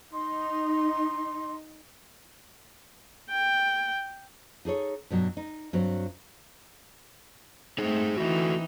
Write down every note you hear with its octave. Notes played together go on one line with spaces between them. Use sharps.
D#4 C6
G5
D#4 G#4 A4 C#5
G2 B2 F#3
D#4
G2 F#3 C4
A3 C4 D#4 G#4 C5
E3 A3 C4 D#4 F#4